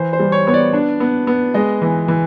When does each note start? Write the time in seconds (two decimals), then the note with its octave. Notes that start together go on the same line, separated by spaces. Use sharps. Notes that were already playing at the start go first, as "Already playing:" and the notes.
Already playing: E3 C5
0.13 C5
0.19 G3
0.32 C#5
0.47 B3 C#5
0.54 D5
0.73 D4
1.00 B3
1.27 B3
1.54 G#3 D#5
1.82 E3
2.08 E3